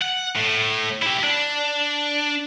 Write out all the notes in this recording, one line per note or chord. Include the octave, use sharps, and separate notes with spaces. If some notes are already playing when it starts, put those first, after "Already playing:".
F#5
A2
E4 G4
D4